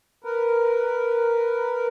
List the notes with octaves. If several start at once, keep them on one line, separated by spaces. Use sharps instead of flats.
A#4 B4